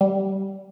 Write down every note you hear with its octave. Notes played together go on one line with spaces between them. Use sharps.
G3